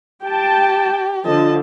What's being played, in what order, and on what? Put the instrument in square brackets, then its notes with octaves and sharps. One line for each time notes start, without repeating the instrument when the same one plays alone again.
[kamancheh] G4 [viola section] G5 A5
[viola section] D3 F3 [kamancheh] D#5 A5